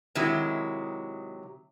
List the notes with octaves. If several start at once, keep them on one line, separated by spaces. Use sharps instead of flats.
C3 D#3 F#3 G#3 E4